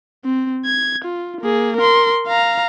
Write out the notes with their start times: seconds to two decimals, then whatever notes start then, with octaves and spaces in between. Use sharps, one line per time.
0.24 C4
0.66 G#6
1.04 F4
1.41 A#3 G#4
1.77 A#4 C6
2.28 F5 A#5